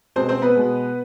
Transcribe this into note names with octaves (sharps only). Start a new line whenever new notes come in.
B2 G#3 C4 C5
C4 C5
B3 B4
B2 G#3